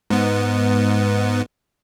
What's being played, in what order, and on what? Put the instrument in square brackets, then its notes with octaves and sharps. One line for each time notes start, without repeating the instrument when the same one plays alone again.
[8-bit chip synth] G#2 B3